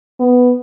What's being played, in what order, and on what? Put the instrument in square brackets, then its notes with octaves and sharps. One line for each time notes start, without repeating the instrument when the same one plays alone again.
[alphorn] B3